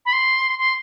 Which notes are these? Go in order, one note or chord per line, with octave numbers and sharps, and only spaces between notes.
B5
C6
C6